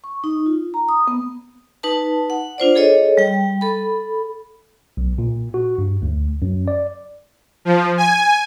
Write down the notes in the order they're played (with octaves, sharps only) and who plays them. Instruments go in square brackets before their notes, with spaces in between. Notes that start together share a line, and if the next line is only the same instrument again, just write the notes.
[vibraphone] C#6
D#4
F4
A#5
D#6
B3
D#4 B4 A5
F#5
D4 F4 C5 D5
G#4 A4 C#5 D#5
G3 G5
A4 B5
[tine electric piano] B1
A#2
F#4
G2
D2
F#2
D5
[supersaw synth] F3
G#5